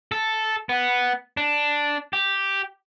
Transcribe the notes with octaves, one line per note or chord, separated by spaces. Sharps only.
A4
B3
D4
G4